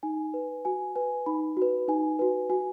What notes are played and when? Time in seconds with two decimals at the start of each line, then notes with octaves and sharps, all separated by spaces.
0.03 D#4 G#5
0.34 B4
0.65 F#4 G#5
0.96 B4 G#5
1.26 D#4 B5
1.57 F#4 B4
1.88 D#4 G#5
2.19 F#4 B4
2.50 F#4 G#5